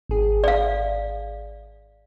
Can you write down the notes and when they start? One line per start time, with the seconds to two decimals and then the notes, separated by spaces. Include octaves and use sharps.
0.09 G#1 G#4
0.44 D5 F5